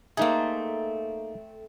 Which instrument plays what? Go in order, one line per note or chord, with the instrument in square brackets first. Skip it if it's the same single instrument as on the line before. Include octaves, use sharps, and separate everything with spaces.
[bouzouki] A3 C4 [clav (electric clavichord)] A#3 D#4 G#4